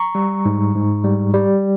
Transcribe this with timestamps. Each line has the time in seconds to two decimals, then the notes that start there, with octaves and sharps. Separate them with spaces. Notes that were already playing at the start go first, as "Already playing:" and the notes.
Already playing: A#5 C#6
0.15 G3
0.45 G#2
0.75 G#2
1.04 G3
1.34 G3